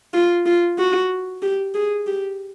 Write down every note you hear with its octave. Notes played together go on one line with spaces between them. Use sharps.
F4
F4
F#4
G4
G#4
G4